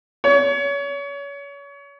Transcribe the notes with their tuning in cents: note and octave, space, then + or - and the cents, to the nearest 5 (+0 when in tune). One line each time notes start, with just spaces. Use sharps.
C#5 +30